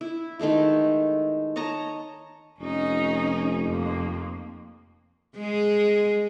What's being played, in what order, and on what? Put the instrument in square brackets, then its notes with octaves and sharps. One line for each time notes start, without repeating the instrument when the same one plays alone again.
[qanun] E4
D#3 G#3 A3 E4
C#5 D#5 A5 A#5
[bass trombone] F1 [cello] C#4 D#4
[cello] F2 A#3
[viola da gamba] G#3 G#4